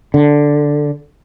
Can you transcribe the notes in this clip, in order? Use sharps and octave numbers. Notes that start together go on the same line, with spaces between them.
D3